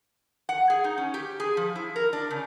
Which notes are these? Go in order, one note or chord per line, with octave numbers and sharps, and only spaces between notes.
F#5
G#4
D#4
C#4
G4
G#4
F3
E4
A#4
D4
C#3